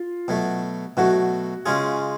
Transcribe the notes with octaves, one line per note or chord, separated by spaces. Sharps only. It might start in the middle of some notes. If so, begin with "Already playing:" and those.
Already playing: F4
B2 F#3 A3
B2 F#3 A3 F#4
C#3 G#3 C#4 F4 G#4